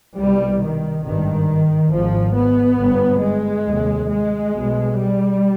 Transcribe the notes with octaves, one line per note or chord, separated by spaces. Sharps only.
C2 B2 G3
D#3
G#1 G2 D#3
G#1 G#2 F3
B3
G1 G2
G#3
F1 D#2
G#3
B1 B2
G3